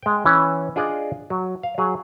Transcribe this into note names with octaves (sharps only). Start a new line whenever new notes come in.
G#3 G5
E3 C#4
D4 F4 G#4 D5 D#5
F#3
F5
F#3 G#4